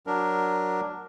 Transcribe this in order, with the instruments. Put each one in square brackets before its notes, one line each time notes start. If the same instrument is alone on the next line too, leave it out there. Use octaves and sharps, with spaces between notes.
[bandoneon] F#3 D4 A#4